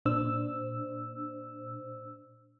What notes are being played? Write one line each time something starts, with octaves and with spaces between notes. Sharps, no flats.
A#2 D4 C5 E6